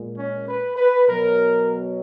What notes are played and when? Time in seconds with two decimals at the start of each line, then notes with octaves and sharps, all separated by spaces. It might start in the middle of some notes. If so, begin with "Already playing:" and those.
Already playing: A#2 G#3
0.17 C#4
0.48 B4
0.77 B4
1.07 B2 F#3 A#4